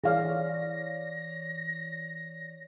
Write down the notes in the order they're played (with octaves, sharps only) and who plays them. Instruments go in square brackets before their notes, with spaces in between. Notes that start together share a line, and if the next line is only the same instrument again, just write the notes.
[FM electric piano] E3 C#5 D5 [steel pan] G#4 F5 [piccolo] A#6